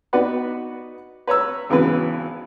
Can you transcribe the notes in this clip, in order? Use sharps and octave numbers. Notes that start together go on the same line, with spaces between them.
B3 D#4 F#4 B4 D5 F#5
B4 C#5 A#5 E6
G#1 C#3 E3 F#3 B3 B4